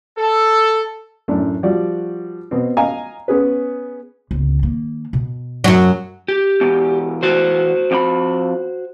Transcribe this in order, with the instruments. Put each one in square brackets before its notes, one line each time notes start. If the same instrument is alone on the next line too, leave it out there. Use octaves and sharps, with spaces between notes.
[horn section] A4
[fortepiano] F#2 A2 A3 D4
F3 G3 F#4 D5
B2 B3 C4
D#5 F5 G#5 A#5
B3 C#4 G#4 B4
[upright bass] G1 C#2
D#3 A#3
B2
[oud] F#2 F#3
[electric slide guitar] G4
[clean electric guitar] E2 B2
[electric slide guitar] F#4 C5
[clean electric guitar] F2 G4 B5